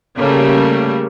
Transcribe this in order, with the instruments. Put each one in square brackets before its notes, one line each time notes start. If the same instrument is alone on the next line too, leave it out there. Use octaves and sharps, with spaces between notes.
[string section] C#3 G3 A3 A#3